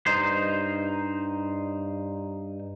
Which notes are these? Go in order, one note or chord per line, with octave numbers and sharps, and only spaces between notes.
G2 D#4 C5